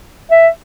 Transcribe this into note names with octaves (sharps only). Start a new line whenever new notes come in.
E5